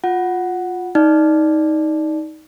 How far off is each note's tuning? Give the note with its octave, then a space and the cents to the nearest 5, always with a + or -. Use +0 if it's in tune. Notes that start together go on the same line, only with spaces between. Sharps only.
F4 +20 F#5 +0
D#4 +15 D5 +0